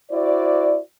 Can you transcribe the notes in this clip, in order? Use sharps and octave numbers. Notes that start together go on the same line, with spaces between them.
E4 F#4 C5 D5